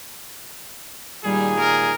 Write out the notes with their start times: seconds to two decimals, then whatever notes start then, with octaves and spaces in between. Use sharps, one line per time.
1.24 A#2 D#3 G3 G#4
1.60 A#4